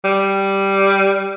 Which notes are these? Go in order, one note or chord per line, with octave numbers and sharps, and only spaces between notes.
G3